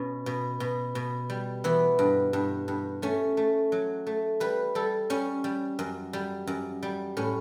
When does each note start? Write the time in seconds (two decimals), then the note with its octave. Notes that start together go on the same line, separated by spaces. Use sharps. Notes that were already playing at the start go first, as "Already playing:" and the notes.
Already playing: B2 C#4
0.26 B2
0.60 B2
0.95 B2
1.30 G3
1.64 E3 B3
1.99 G2
2.33 G2
2.68 G2
3.02 A3 C#4
3.37 A3
3.72 F#3
4.06 A3
4.40 G3 B4
4.75 G3 A4
5.10 G3 C#4
5.44 G3
5.79 F#2
6.13 G3
6.47 F#2
6.83 G3
7.17 A2 C#4